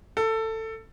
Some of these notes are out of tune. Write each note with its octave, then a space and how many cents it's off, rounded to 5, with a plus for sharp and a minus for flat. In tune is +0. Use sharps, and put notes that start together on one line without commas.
A4 +15